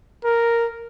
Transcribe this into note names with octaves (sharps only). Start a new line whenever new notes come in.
A#4